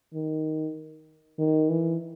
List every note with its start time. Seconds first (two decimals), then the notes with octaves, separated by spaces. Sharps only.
0.14 D#3
1.39 D#3
1.69 E3